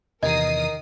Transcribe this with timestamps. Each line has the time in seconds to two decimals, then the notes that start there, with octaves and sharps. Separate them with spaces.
0.23 E2 C3 D#3 E3 A#4 D#5 D#6 C7